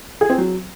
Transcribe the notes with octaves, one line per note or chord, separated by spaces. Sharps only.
G#4
C4
F#3